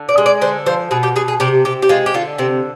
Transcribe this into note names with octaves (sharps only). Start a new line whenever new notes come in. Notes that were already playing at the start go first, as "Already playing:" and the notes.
Already playing: D3
D5
G#3
D5
D3 C5
F3 C5
B2 G#4
G4
B2 G#4
G#4
C3 G4
C3 G4
G4
G#3 F4
G4
D3 F4
C3 C4